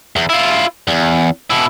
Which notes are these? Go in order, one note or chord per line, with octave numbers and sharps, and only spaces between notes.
E2
E4 F4
E2
B2 E4